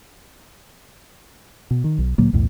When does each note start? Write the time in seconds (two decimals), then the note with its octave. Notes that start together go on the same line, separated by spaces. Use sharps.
1.71 B2
1.84 D#3
1.98 B1
2.18 D2 A#2 F#3 A#3
2.33 B1 E2 A2